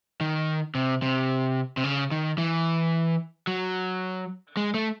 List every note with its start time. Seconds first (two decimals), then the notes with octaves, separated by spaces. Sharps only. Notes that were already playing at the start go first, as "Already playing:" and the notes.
0.21 D#3
0.75 C3
1.02 C3
1.77 C3
1.84 C#3
2.11 D#3
2.38 E3
3.47 F#3
4.57 G#3
4.74 A3